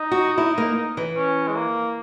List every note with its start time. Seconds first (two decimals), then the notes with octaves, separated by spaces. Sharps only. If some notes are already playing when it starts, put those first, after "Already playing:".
Already playing: D#4
0.11 F#4
0.38 E4
0.58 A#3
0.97 E3
1.16 C#4
1.48 G#3
1.56 A#3